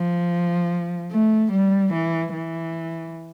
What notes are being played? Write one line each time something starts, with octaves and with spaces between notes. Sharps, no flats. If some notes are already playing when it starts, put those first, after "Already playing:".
Already playing: F3
A3
G3
E3
E3